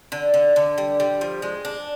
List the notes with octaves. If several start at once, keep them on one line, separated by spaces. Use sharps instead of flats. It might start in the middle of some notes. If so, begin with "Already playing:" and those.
D3
D3
D3
G3
G3
F3
G#3
D4